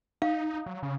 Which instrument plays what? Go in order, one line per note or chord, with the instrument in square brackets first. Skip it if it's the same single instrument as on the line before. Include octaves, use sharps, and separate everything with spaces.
[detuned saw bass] D#4 [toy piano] F5
[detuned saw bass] F#3
C#3